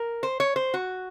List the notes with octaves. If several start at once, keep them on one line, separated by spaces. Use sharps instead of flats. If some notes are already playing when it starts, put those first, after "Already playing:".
Already playing: A#4
C5
C#5
C5
F#4